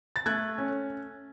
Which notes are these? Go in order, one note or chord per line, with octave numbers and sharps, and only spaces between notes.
A6
A3 F#6 G#6
C#4